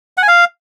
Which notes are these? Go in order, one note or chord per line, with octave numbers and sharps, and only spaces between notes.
F#5
G#5
F5